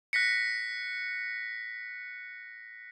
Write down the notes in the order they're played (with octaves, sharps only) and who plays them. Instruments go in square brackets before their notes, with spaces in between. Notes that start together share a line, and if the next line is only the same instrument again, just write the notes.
[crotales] F#6 A#6 B6 C#7